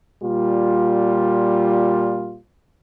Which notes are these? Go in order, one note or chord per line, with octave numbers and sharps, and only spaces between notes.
A#2 G3 F4